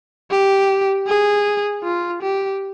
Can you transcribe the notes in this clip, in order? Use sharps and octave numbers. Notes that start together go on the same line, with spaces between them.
G4
G#4
F4
G4